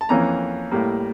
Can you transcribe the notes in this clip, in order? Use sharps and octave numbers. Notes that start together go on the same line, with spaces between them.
A5
F2 E3 A#3 C#4 A#5
A2 G3 A#3